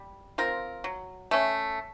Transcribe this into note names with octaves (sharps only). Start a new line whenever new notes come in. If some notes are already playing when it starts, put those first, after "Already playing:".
Already playing: G3
C4 F4 A#4
F#3
A3 C#4